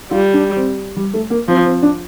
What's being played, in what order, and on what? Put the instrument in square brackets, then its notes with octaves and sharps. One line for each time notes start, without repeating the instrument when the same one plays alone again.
[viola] G3 [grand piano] F4
[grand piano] D4
C4
G3
A3
A#3
[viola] F3 [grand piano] C4
[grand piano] C4
D4